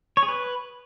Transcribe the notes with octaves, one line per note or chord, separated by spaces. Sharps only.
C#5
G#4
B4